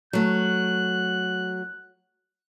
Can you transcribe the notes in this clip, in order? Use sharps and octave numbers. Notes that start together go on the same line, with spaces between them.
F#3 A3 F#6